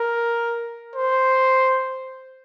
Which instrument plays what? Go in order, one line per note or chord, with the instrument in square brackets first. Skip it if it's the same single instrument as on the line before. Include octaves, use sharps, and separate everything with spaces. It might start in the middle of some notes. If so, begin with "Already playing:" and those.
Already playing: [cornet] A#4
C5